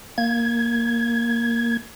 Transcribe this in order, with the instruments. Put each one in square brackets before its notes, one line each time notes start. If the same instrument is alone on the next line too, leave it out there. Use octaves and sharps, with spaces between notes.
[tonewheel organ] A#3 G#6